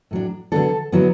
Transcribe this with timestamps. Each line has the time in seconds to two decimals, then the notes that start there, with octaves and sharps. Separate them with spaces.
0.11 A2 F#3 D4
0.52 D3 F#3 B3 D4 A4
0.92 D3 F#3 B3 E4